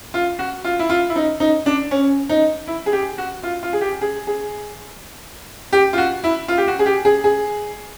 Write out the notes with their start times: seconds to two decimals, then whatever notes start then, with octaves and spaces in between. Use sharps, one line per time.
0.14 F4
0.39 F#4
0.64 F4
0.79 E4
0.89 F4
1.09 E4
1.16 D#4
1.40 D#4
1.66 D4
1.91 C#4
2.29 D#4
2.67 E4
2.86 G#4
2.93 G4
3.18 F#4
3.43 F4
3.63 F4
3.73 G#4
3.81 G4
4.01 G#4
4.27 G#4
5.73 G4
5.93 F4
5.98 F#4
6.24 E4
6.48 F4
6.58 G4
6.68 F#4
6.79 G#4
6.86 G4
7.05 G#4
7.24 G#4